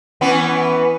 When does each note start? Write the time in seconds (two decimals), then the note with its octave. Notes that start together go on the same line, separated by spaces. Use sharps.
0.21 E3 B3 C#4